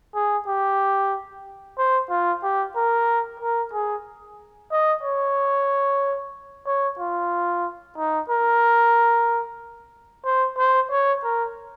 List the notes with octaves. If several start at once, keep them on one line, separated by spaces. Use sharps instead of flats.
G#4
G4
C5
F4
G4
A#4
A#4
G#4
D#5
C#5
C#5
F4
D#4
A#4
C5
C5
C#5
A#4